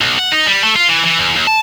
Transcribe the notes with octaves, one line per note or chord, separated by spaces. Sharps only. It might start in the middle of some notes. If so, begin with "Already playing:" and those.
B1
F#5
D#4
G3
A3
F4
E3
E3
E2
D#2
A5